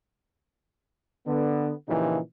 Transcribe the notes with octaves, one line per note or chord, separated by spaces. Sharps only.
D3 B3
A#2 C#3 E3 F3 D#4 G4